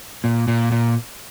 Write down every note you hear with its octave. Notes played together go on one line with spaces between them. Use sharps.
A#2
A#2
A#2